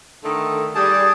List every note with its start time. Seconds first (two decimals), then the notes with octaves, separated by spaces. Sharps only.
0.23 D3 D#3 A3
0.75 G3 G#4 A5